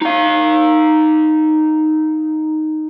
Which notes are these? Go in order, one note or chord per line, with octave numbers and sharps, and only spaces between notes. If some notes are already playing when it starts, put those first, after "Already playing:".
D#4 F5